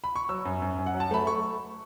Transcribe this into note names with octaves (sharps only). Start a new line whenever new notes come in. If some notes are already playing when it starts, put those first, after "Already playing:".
B5
C#6
F#3 E6
F#2
F#2
F#2
F#5
F#3
A5
A3 B5
A3 C#6